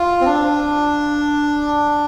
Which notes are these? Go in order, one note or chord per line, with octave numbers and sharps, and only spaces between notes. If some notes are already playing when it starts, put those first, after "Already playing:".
Already playing: F4
C4
D4